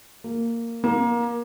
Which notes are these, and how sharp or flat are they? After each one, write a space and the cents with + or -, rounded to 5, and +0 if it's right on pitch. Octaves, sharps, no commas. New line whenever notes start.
A#3 -10
A#3 +25